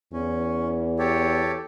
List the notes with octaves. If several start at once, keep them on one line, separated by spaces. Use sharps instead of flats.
E2 C#4
G4 A4 C#5